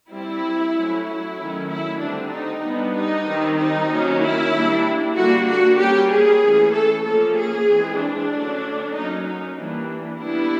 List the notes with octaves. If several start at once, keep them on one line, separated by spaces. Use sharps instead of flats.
G3 C4 E4
F#3 A3 C#4
E4
D#3 F#3 A3 C#4
E4
D3 G3 C4 D4
D#4
G3 B3 D4
D#4
D#3 G3 C4
D#4
D#3 F#3 A#3 C#4
E4
G3 A#3 D4
D3 G3 A#3 D4 F#4
F#4
G3 A#3 C#4 G4
G#4
E3 A3 C#4
A4
F3 A#3 C#4 A4
G#4
E3 G#3 C4
D4
D3 F#3 A3 C#4
F#3 A#3 C#4 D#4
D#4
E3 G3 A#3 D4
G3 B3 D4 E4